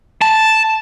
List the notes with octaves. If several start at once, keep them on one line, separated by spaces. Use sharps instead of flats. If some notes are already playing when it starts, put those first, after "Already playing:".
A5